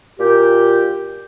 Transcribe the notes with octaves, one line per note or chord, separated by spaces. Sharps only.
A#2 G4 G5